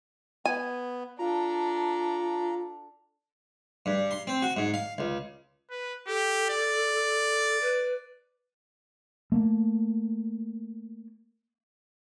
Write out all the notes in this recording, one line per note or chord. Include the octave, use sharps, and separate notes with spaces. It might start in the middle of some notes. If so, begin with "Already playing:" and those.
B3 G#5
D4 F4 A4 A#5
G2
C6
C4
F#4
G#2
F5
C#2
B4
G4 A4
D5
B4
A3 A#3